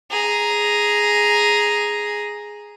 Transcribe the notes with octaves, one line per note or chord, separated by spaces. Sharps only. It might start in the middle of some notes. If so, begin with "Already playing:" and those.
G#4 A#5